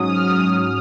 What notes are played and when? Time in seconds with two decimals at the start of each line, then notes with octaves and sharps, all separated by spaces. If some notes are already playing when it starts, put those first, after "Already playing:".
Already playing: G#2 F#3 C#4 D#6
0.09 F6
0.24 D#6